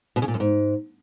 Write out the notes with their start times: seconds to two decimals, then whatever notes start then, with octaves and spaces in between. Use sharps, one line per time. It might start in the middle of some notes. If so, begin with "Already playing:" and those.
0.16 B2
0.22 C#3
0.28 A#2
0.34 F#2
0.40 G#2